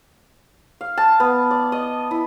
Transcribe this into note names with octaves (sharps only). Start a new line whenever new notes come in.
F5
A5
B3
D5
D#5
E4